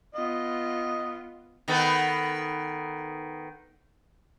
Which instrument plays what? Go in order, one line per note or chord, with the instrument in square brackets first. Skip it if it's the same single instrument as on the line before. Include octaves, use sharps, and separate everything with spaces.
[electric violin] B3 F4 [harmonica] D#5
[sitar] D#3 B3 A4